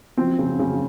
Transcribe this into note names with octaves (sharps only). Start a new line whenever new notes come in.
F3 C4
C#3
C#3